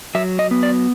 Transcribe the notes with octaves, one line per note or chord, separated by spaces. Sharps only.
F#3 E5
D#5
B3
D5